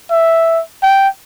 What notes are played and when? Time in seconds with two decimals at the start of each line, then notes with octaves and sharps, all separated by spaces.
0.11 E5
0.83 G5